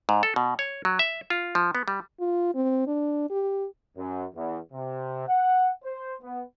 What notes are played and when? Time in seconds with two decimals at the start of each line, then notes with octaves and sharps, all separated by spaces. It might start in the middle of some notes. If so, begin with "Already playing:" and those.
0.09 G#2
0.23 A4
0.36 B2
0.59 C#5
0.85 F#3
0.99 E5
1.30 F4
1.55 F3
1.75 B3
1.88 G3
2.20 F4
2.55 C4
2.87 D4
3.30 G4
3.97 F#2
4.35 E2
4.72 C3
5.28 F#5
5.83 C5
6.22 B3